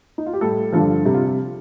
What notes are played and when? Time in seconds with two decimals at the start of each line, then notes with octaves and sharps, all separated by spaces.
0.18 D#4
0.26 F4
0.33 G4
0.41 A2 G3 A4
0.73 G2 D3 F3 A4
1.06 C3 G3
1.14 F4